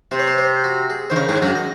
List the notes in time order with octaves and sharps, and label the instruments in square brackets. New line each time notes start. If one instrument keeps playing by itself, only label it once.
[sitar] C3 [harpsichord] C5
[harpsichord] C#5
C5
C5
F#4
G#4
[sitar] D#3 [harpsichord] C5
[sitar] C#3 [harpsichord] A#4
[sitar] G#2 [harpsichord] G#4
[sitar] F#2 [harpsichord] F#4
[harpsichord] D#5